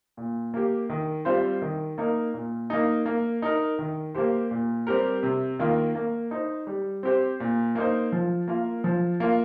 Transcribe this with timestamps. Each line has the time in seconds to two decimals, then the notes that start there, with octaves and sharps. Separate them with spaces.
0.17 A#2
0.54 A#3 G4
0.90 D#3
1.25 G3 C4 F4 C5
1.62 D#3
1.98 A#3 D#4 A#4
2.34 A#2
2.70 A#3 D#4
3.06 A#3
3.42 D#4 A#4
3.79 D#3
4.15 A#3 G4 C5
4.51 A#2
4.87 G3 C4 G4 A#4
5.23 C3
5.59 D#3 A#3 F4
5.95 A#3
6.31 D#4 C5
6.67 G3
7.03 C4 G4 C5
7.40 A#2
7.75 A#3 D#4 C5
8.12 F3
8.48 A#3 F4 A#4
8.84 F3
9.20 A#3 F4